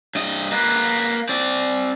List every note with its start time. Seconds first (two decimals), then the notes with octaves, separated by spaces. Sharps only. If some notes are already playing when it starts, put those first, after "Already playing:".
0.15 G2 D#5
0.52 A#3 B4
1.29 C4 D5